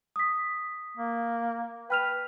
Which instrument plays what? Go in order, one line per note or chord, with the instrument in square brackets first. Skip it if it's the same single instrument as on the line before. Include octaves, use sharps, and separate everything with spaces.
[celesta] D#6 B6
[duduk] A#3
[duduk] B4 [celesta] G5 F6 F7